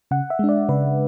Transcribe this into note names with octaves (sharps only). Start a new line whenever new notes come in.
C#3 F#5
E5
G#3 D4
D5
C#3 B4